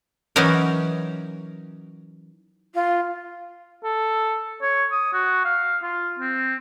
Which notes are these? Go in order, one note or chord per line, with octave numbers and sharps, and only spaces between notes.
E3 F#3 C#4 D#4 A#4
F4
A4
C#5
D#6
F#4
F5
F4
C4